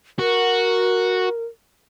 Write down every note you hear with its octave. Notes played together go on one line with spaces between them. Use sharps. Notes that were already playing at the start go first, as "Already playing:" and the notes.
F#4 A#4